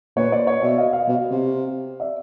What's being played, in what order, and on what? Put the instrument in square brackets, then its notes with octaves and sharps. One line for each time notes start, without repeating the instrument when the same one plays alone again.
[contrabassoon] A#2 [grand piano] B4 C#5
[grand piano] C5 D5
C#5 D#5
[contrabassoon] B2 [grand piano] D5 E5
[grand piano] D#5 F5
D#5 F5
[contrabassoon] B2
C3
[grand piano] D5 E5